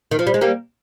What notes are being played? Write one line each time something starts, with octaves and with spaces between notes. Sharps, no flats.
D#3
F3
G3
G#3
G3 A#3